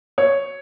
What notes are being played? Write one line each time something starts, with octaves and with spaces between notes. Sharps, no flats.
C#5